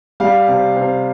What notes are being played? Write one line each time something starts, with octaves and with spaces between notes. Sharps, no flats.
G3 F5
C3
C3